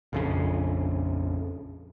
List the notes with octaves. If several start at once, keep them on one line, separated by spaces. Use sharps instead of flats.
A#1 F2 C#3